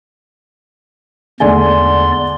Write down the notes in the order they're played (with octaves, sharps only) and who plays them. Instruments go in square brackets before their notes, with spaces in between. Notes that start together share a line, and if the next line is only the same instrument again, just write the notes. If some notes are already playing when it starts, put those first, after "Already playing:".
[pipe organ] E2 D5 C6 [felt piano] G#2 D3 A3 [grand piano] G#5